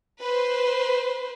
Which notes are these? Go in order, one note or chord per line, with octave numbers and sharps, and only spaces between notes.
B4 C5